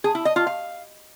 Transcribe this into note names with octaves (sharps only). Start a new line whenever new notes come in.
G#4
E4
D#5
F4
F5